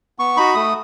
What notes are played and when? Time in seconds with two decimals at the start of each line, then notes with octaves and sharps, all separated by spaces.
0.19 B3 C#6
0.37 D#4 F#4 B5
0.55 A3 D#6